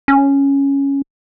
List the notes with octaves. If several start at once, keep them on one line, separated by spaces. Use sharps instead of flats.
C#4